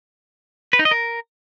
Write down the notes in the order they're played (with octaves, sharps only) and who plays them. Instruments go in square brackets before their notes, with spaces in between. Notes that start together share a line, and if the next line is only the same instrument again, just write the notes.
[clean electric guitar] B4
D#4
D#5
A#4